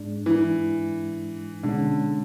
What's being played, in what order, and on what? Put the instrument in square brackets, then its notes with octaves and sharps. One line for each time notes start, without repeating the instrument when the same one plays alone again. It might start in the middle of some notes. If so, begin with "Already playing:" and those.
Already playing: [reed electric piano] G#2 G#3 D4
[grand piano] E3
[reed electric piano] B2 G#3 C#4 [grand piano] D3